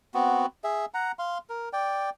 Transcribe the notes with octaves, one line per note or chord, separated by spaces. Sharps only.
B3 C4 F#4
G#4 E5
F#5 A#5
F5 C6
A#4
D5 G5